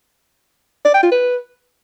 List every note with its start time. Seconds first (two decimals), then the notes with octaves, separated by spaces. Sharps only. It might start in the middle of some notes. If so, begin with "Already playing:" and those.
0.85 D5
0.94 G5
1.03 F4
1.12 B4